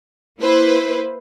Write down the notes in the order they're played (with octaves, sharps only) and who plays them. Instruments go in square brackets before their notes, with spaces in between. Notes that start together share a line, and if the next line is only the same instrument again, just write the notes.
[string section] A#3 E4 B4 C5